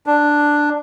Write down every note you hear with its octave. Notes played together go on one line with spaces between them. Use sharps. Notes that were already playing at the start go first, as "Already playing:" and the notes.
D4